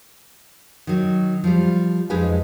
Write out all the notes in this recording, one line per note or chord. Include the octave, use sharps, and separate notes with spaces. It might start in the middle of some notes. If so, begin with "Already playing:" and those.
D#3 F#3
F3 G3
F2 G#3 D#4 B4 G#5